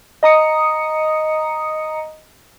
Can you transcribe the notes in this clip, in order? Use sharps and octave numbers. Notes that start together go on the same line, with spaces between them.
D#5 A#5 D#6 C#7